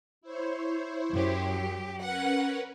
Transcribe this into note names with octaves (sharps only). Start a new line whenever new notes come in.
E4 C5 C#5
F#2 F#3 G4
C#4 A#4 B4 F#5